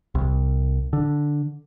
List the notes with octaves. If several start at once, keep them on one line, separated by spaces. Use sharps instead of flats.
C2
D3